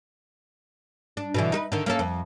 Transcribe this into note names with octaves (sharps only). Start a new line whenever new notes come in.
D4
B2 D3 E3
D#4 A4 B4
D3 D#3
A#3 C#4 A4
F2